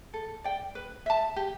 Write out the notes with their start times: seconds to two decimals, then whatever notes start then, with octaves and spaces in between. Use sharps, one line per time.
0.14 A4
0.44 D5 G5
0.75 B4
1.06 E5 A5
1.36 G4